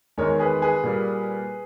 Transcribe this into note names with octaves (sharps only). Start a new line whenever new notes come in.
E2 D#3 G#3 A#4 C#5
G#4 B4
G#4 B4
A#2 G3 A#3